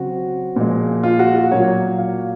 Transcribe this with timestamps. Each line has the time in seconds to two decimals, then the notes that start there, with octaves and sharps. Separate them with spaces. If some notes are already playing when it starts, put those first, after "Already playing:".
Already playing: C#3 F#3 C4 F#4
0.56 A#2 F3 G#3
1.03 F4
1.19 F#4
1.36 F#4
1.51 A#2 F#3 A#3 C#5
1.98 F5